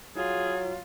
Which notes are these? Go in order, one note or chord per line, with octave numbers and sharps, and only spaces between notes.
F#3 F4 G#4